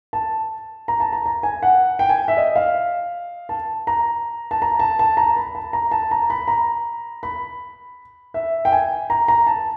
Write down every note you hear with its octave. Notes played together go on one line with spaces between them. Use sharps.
A5
A#5
A5
A#5
A#5
G#5
F#5
G5
G#5
E5
D#5
F5
A5
A#5
A5
A#5
A5
A5
A#5
B5
A5
A#5
A5
A#5
B5
A#5
B5
E5
G5
G#5
A#5
A#5
A5